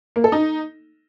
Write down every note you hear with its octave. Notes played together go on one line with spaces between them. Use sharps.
A#3
A4
D#4